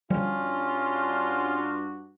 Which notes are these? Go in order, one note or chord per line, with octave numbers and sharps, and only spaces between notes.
G2 D3 F3 G3 C#4 D4 F4 F#4